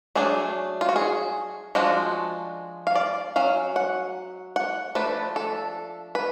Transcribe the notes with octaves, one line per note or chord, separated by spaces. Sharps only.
F#3 A3 D4 G#4
F4
F#4
G#4
F3 G#3 D4 F#4
F5
D5
F#3 C#4 F5
F#5
F#5
F3 A3 D4 B4
A4
B4